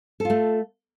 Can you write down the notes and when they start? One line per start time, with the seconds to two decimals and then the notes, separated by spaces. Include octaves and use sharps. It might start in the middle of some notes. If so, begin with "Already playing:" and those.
0.20 A4
0.25 F4
0.30 A3